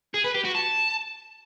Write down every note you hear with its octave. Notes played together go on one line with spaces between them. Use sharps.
G#4
B4
G4
F#4
A5